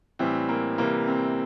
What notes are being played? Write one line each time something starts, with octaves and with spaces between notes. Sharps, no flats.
A2 E3 G3 C4
A#3
C3 E3 G3 A#3
C4